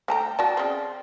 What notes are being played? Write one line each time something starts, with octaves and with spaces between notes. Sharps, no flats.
A3 G5 A5 A#5
F#4 D5 A5
C#3 C4